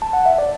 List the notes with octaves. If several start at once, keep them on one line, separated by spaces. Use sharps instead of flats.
A5
F#5
E5
D5